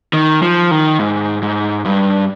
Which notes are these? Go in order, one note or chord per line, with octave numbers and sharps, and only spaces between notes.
D#3
F3
D#3
G#2
G#2
G2